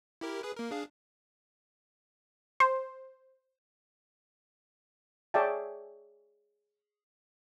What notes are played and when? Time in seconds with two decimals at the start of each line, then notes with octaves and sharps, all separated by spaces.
0.21 E4 G4 A#4
0.43 G#4 B4
0.57 A#3 A#4
0.71 D4 G#4 F5
2.60 C5
5.34 G#4 C#5 D5 E5 G5 A5